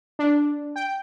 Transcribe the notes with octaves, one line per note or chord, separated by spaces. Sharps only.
D4
G5